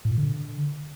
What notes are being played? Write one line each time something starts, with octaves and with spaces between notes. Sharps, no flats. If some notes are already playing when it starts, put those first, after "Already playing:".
A2
A#2
D3